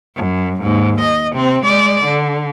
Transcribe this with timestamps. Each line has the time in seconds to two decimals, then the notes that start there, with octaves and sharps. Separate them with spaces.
0.16 F#2
0.61 D#2 G#2
1.01 D#5
1.33 C3 C4
1.65 G#3 D5
2.05 D3